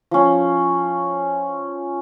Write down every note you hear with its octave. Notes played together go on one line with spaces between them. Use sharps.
F3 C#4